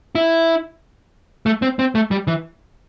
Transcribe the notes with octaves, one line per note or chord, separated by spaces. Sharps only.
E4
A3
C4
C4
A3
G3
E3